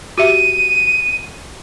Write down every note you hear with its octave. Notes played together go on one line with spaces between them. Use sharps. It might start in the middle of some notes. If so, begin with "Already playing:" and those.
F#4 G4 E5 D#7